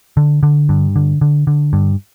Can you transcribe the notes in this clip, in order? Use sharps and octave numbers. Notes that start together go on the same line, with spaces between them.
D3
D3
G2
D3
D3
D3
G2